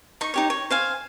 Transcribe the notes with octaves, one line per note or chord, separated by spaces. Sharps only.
D#4 C#6
D#4 G4 C#5
C#5
C5 F5 G#5